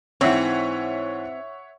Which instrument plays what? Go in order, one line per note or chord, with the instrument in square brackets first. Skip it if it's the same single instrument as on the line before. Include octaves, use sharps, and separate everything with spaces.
[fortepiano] G#2 E3 [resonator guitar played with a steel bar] C4 [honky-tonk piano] C#5 E5 F#5